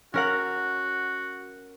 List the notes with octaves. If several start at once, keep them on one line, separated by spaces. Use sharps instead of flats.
C#4 F#4 A#4 F#5